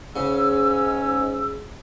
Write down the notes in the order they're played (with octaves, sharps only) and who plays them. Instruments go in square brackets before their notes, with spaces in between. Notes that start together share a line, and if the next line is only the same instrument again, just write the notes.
[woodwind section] G#2 C#4 E6 [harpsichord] C#3